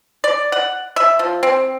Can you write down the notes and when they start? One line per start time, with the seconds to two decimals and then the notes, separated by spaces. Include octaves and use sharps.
0.24 D5
0.52 F#5
0.96 E5
1.19 F3
1.43 C4